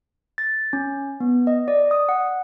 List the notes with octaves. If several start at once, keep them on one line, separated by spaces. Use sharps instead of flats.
A6
C#4
B3
D#5
D5
D#6
F#5